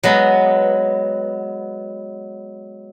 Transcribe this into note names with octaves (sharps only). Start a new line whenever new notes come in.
F#3 G#3 B3